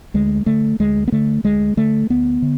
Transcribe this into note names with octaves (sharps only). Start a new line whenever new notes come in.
D2 G#3
D3 A3
D2 G#3
B3
D3 A3
D2 G#3
D3 A3
D2 B3
D3